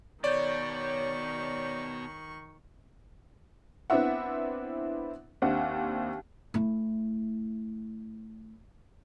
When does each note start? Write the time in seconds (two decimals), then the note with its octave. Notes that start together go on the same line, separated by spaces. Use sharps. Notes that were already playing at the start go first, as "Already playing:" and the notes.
0.24 B2 D#3 C#5 D5 C#6 G6
3.90 B3 C4 D4 E4 E5 F#5
5.42 D#2 C4 D4 E5 F#5
6.54 A3 E4